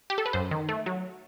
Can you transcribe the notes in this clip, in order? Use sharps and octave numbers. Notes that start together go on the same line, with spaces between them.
G4
A4
B4
F#2 C5
D#3
A3
F#3